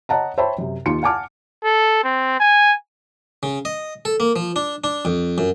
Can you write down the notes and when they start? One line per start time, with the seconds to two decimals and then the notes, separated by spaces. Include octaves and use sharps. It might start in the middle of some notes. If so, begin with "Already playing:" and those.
0.09 C#5 D#5 F#5 A5 A#5
0.38 C5 C#5 E5 G5 A5 B5
0.58 F#2 C3
0.86 D#2 F4 C6 C#7
1.03 F#5 G#5 A5 D6 F6
1.64 A4
2.04 C4
2.40 G#5
3.43 C#3
3.65 D#5
4.05 A4
4.20 A#3
4.36 F3
4.56 D4
4.84 D4
5.05 F2
5.38 F#2